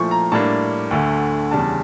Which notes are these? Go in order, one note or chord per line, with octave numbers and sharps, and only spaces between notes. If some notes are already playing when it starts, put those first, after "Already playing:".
Already playing: A#2 F3 A3 E4 C#6
A#5
A2 G3 A#3 D4 A5
D2 D3 A3
E2 C#3 G3 D4 A5